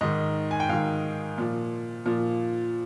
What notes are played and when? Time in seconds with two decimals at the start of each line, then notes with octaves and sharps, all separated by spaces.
0.01 G#2 D#3 D#5
0.51 G#5
0.60 G5
0.69 G#2 D#3 F5
1.38 A#2 F3
2.06 A#2 F3